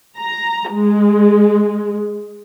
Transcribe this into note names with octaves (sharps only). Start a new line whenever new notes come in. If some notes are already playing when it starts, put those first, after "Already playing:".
A#5
G#3